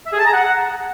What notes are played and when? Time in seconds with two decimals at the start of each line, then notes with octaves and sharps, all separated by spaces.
0.05 E5
0.12 G#4
0.19 A5
0.26 A#5
0.33 F#5